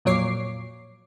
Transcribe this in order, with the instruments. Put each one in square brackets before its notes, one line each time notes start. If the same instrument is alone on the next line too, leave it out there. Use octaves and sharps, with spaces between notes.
[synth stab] F2 A#2 F#3 C#5 D6 C7